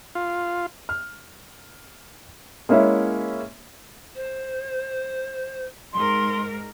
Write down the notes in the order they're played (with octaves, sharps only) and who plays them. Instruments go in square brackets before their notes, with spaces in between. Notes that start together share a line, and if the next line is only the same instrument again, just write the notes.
[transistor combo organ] F4
[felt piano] F6
G#3 A#3 C#4 E4 C#5 E5
[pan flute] C5
[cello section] G#2 A#4 [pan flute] C6